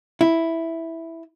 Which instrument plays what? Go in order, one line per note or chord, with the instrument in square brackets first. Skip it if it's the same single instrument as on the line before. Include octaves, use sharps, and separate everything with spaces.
[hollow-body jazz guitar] E4